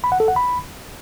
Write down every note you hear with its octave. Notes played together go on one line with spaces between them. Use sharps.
B5
F#5
A4
F#5
B5